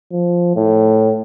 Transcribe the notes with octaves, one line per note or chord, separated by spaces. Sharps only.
F3
A2